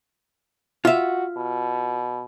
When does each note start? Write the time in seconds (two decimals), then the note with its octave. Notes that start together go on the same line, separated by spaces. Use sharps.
0.85 F4 F#4 E5
1.37 B2